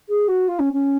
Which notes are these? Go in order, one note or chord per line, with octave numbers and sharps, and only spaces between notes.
G#4
F#4
F4
C#4
C#4